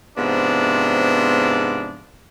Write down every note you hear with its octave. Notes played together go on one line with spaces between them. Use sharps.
G#2 C3 F3 B3 D4